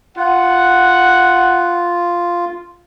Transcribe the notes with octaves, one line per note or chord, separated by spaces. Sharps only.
F4 F#5